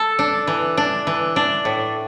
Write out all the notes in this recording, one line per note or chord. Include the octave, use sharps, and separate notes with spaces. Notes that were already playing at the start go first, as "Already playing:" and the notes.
Already playing: A4
D4
E3
D4
E3
D4
A2